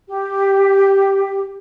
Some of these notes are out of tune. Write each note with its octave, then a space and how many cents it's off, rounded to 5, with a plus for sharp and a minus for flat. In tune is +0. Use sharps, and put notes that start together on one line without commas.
G4 +0